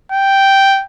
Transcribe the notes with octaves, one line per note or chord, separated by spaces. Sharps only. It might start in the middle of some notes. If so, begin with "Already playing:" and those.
G5